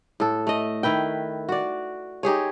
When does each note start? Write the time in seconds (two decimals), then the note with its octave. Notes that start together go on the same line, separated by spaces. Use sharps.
0.20 A2 A4
0.47 A3 D#5
0.83 D#3 E4 B4 G5
1.49 F#4 D5
2.23 D#4 G4 G#4 C#5